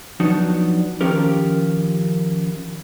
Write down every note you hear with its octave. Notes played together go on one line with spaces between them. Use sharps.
F3 F#3 B3 D4 D#4 F#4
D#3 F3 C#4 F4 G4 A#4